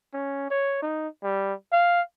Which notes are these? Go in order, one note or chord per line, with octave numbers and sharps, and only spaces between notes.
C#4
C#5
D#4
G3
F5